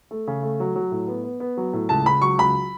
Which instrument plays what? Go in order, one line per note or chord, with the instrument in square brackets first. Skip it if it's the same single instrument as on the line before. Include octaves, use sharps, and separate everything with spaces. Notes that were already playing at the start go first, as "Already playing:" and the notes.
[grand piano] A3
C#3
A3
F#3
F#3
A2
B3
B3
B3
F#3
A2
C#2 A5
C#2 B5
F#3 C#6
C#2 B5